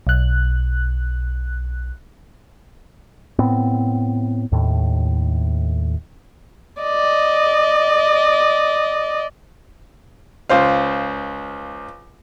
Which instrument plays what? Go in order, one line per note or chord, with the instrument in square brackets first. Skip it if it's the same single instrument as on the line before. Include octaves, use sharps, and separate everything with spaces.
[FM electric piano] B1 F#6
[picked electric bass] A2 B3 C4
D#2 A2
[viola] D5 D#5
[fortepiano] C#2 C5 F5